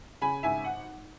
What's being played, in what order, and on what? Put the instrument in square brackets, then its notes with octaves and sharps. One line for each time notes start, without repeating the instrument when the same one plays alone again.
[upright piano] C#3 G#5 B5
G#1 E5 G#5
F#5